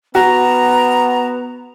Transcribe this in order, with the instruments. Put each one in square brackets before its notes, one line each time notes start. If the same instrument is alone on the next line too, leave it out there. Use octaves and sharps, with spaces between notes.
[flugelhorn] B3 [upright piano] F#4 [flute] A#5